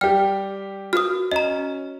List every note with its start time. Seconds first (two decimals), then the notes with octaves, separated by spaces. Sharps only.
0.01 G3 G4 G5 F6
0.93 F#4 A#4 B4 D#6 F6
1.32 C#4 D#5 A#5